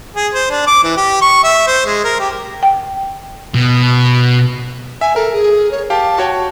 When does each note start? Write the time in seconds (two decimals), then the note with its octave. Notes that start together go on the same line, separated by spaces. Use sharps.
0.16 G#4
0.34 C5
0.50 D4
0.67 D6
0.83 E3
0.97 G4
1.22 C#6
1.44 E5
1.67 C5
1.86 G#3
2.04 A#4
2.20 G4
2.63 G5
3.54 B2
5.01 E5 G#5
5.16 A4 A#4
5.33 G#4
5.71 C#5
5.90 G4 F5 G5 A5
6.18 F#4 C#5 G5